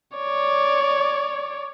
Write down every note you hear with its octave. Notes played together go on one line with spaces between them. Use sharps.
C#5 D5